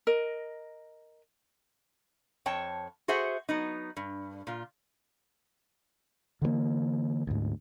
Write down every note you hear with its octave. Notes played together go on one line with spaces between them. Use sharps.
A#4 D#5
F2 C#5 G5 A5
F#4 G#4 C5 E5 F#5
F#3 B3 D#4
G2
A#2 F4
D3 E3 G3 A#3
D2 G#2